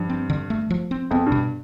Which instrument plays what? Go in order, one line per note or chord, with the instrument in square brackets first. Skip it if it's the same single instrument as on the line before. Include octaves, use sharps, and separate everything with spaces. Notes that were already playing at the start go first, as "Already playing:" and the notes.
Already playing: [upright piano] G2 [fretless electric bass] F3
[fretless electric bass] C4
D3
A3
F3
C4
[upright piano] F2 [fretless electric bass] B3
[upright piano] G2
[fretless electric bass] B2